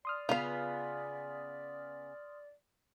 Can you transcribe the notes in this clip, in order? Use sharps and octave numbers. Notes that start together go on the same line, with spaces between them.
D5 C6 D#6 F6
C#3 B3 F4 F5